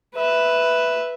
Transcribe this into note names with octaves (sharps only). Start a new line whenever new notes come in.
B4 E5